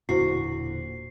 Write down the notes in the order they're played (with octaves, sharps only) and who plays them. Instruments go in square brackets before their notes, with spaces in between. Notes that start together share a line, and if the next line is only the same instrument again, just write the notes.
[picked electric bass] E1 A#2 D3 [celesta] E4 C5 [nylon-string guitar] F#4 [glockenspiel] C7